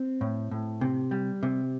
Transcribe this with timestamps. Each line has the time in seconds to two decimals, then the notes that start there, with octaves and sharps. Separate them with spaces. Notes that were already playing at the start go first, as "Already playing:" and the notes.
Already playing: C4
0.21 A2
0.51 A2
0.81 C3
1.11 G3
1.43 C3